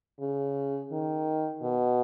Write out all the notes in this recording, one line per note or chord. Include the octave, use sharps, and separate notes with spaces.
C#3
D#3
B2